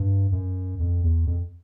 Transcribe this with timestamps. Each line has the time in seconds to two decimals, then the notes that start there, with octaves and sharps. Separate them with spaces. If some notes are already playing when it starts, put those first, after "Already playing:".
Already playing: G2
0.32 F#2
0.79 F2
1.04 E2
1.27 F2